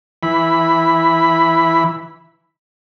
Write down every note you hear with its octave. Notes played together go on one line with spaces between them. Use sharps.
E3 B5